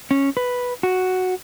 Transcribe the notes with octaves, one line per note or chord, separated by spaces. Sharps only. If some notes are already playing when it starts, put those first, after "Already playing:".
C#4
B4
F#4